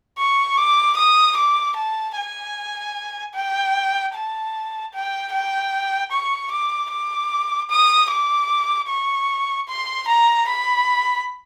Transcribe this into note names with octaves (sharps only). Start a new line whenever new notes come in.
C#6
D6
D#6
D6
A5
G#5
G5
A5
G5
G5
C#6
D6
D6
D#6
D6
C#6
C6
A#5
B5